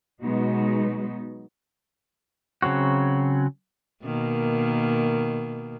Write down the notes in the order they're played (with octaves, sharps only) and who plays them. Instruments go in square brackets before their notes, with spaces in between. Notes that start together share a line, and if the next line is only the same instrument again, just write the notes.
[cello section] B2 F#3 G#3 B3 D#4 F#4
[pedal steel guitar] C#3 F#3 C4 F#4
[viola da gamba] B2 D#3 A#3